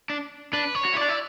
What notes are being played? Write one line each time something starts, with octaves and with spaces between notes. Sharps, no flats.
D4
D4 B4
C#5
F#4
E4 D5
D4
E4